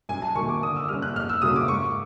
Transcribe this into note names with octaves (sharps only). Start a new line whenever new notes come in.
F#2 G#5
A5
D#3 F#3 A#3 C#6
D6
D3 D#6
E6
G3 A#3 C#4 F6
F#6
F2 F6
E6
C#3 F#3 A#3 C#4 D#6
D6
G#2 C#6